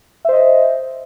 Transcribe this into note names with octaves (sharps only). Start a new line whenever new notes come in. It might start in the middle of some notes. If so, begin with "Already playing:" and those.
C5 D#5 E5